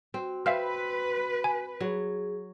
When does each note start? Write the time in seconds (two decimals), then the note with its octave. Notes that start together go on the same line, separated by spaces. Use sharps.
0.14 C4 F#4
0.46 C4 B4 E5 F5 F6
1.44 G#5
1.81 F#3 G#4